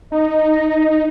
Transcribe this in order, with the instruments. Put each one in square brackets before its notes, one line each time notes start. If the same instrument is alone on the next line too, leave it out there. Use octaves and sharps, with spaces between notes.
[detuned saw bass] D#4 [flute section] D#5